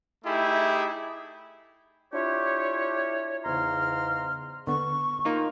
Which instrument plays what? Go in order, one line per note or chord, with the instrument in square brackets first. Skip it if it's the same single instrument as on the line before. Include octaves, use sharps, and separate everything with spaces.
[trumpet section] A3 D#4 E4 G4 G#4
[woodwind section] D4 E4 F4 G4 C#5
E2 G#2 C#3 A#5 C6 F6
[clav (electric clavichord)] D3 B3 [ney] C#6
[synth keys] A#3 D#4 F4